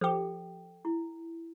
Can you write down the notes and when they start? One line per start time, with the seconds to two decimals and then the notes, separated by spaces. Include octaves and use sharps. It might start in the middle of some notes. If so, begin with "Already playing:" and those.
0.01 F3 G4 A4 D5 G5
0.85 E4